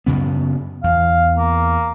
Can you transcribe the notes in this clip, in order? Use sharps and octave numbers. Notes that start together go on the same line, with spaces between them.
F#2 C#3 B3
E2 F5
A#3